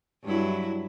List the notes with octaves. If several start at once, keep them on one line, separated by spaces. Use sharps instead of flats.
G2 F#3 E4